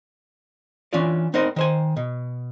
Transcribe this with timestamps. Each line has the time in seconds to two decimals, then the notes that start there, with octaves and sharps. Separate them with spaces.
0.93 E3 C#4 D4 F4 D5
1.34 B3 C4 D#4 A#4 C5 D#5
1.56 D#3 C5 G#5
1.97 B2